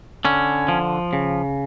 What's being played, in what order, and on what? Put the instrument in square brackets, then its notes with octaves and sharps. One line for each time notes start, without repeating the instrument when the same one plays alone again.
[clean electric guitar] D3 C#4
F3
C#3